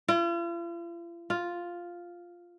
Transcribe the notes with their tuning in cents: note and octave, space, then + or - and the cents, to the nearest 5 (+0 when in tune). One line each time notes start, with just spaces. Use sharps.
F4 -45
F4 +0